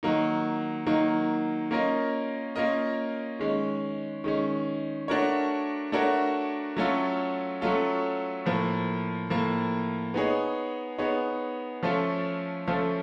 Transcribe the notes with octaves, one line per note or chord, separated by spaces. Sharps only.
D#3 F#3 A#3 D#4
D#3 F#3 A#3 D#4
A#3 C#4 F4 A#4 D#5
A#3 C#4 F4 A#4 D#5
D#3 G#3 C#4
D#3 G#3 C#4
A3 D4 F#4 A#4 C#5
A3 D4 F#4 A#4 C#5
F#3 A3 C#4 F4 A4
F#3 A3 C#4 F4 A4
A2 F3 A#3
A2 F3 A#3
B3 D#4 G#4 C#5
B3 D#4 G#4 C#5
F3 A3 C#4 F4 A4
F3 A3 C#4 F4 A4